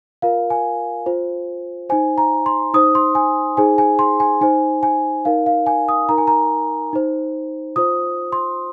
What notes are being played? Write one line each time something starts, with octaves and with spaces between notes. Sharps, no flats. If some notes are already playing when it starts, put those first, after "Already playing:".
F4 A#4 F5
G#5
F4 C5
D#4 C5 G#5
A#5
C6
D#4 C5 D#6
C6
G#5
D#4 G#4 C5 G#5
G#5
C6
G#5
D#4 C5 G#5
G#5
D#4 A#4 F5
F5
G#5
D#6
D#4 A#4 A#5
G#5
A#5
D#4 C5
F4 C5 D#6
C6